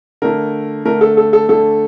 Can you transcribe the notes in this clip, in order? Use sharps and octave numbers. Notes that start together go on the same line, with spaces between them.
D3 A3 A#4
D3 A3 A#4
A4
A4
A4
D3 A3 A4